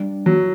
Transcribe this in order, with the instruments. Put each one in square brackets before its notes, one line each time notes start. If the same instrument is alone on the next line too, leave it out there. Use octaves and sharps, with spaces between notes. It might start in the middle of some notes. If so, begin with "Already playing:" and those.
Already playing: [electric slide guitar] G3 D4
[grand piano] F#3